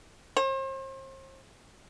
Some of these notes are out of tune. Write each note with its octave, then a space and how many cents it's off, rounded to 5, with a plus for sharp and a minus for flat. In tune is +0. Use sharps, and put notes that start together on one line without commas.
C5 +40